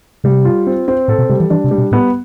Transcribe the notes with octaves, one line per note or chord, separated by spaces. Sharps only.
C3 G3
F4
C4
C4
A2 A4
B2
C3 G3
E3
E3 D4
C3
G3
B2
A2 B3